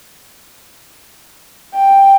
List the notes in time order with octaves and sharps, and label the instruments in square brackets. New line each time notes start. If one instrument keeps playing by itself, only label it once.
[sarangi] G5